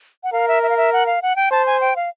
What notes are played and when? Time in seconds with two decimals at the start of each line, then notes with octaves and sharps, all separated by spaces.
0.24 F#5
0.33 A#4 F5
0.48 E5
0.63 E5
0.70 F5
0.77 E5
0.93 F#5
1.06 F5
1.22 F#5
1.36 G5
1.51 C5 A5
1.66 G#5
1.81 G5
1.96 F5